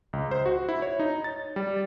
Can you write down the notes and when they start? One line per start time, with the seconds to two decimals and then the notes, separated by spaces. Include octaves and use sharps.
0.13 C#2
0.31 C5
0.46 F#4
0.69 E4
0.82 C#5
1.00 D#4
1.24 A6
1.56 G3